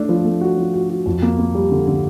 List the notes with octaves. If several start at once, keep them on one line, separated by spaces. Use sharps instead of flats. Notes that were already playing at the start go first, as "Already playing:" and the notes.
Already playing: A3 D4
F3
A3
F#4
F3
F#4
F#4
F2
A#3
A#3
G3
D3
D3